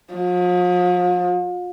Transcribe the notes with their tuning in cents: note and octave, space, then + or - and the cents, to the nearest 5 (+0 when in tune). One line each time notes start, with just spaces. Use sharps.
F3 +40